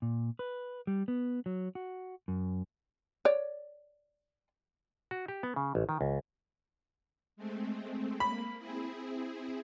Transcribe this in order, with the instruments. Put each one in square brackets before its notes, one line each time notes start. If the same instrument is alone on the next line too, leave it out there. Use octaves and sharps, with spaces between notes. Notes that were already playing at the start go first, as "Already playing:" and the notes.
[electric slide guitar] A#2
B4
G3
B3
F#3
F#4
F#2
[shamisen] C#5 D5
[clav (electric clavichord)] F#4
G4
B3
C#3
A1
D#3
C#2
[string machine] G#3 A3 C4
[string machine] A#3 [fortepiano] B5
[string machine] C4 E4 G#4